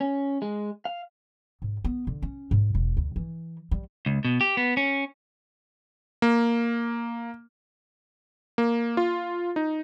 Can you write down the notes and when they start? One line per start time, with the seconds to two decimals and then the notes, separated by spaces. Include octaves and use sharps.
0.01 C#4
0.42 G#3
0.85 F5
1.62 G#2
1.84 B3
2.07 D3
2.22 C#4
2.51 G#2
2.75 E1
2.97 D2
3.16 E3
3.71 G3
4.06 C#2
4.25 B2
4.41 G4
4.57 B3
4.77 C#4
6.22 A#3
8.58 A#3
8.97 F4
9.56 D#4